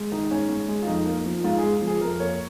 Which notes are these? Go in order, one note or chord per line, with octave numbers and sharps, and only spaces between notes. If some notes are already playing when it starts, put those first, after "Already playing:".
Already playing: G#3
D#3 D#4
G#2 C#4
G#2
G#3
F4
F2 D#4
A#3
F3
G#2 F4
G#4
G#3
F3
G#4
F2 A#4
A#3 C#5